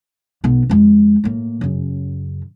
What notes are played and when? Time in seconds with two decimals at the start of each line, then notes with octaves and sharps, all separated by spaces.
0.44 B1 B3
0.69 F2 G#3
1.24 A2 A#3
1.61 F#2 C#3